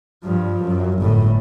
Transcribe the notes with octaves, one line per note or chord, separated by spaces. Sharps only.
G2 F3
F#2
G1 A2